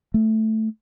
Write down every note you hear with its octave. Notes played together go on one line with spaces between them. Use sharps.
A3